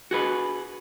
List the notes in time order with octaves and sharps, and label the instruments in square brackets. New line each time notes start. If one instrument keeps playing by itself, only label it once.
[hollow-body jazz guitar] F#4 G#4 B4